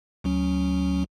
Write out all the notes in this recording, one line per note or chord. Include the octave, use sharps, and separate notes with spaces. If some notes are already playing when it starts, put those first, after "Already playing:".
D2 F#3 C#4